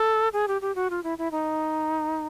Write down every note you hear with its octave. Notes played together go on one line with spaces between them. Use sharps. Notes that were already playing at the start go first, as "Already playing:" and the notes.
Already playing: A4
G#4
G4
G4
F#4
F4
E4
E4
D#4